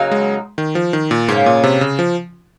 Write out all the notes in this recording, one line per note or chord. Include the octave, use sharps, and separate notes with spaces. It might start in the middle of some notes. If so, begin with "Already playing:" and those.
Already playing: C#3 F#3 A#3 D#4
G#3
D#3
F3
D#3
A#2
G#2 C#3 F3 A#3 C#4
A#2
C3
C#3
F3